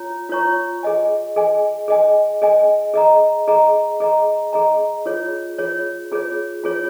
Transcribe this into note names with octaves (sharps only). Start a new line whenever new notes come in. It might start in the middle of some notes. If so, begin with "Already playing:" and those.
Already playing: F4 C#5 A#5
F4 C#5 A#5 C#6
G#4 D#5 G#5
G#4 D#5 G#5
G#4 D#5 G#5
G#4 D#5 G#5
G#4 D#5 A#5
G#4 D#5 A#5
G#4 D#5 A#5
G#4 D#5 A#5
F4 G#4 C#5
F4 G#4 C#5
F4 G#4 C#5
F4 G#4 C#5